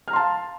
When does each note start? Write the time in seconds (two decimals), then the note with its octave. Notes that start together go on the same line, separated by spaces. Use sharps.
0.08 F6
0.10 A#5
0.13 C6
0.16 A5
0.19 F5